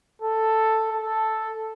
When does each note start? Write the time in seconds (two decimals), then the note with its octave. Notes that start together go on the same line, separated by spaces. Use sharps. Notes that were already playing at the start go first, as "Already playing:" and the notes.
0.22 A4
0.91 A4